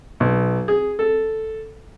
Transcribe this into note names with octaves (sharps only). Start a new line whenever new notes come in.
B1
G#4
A4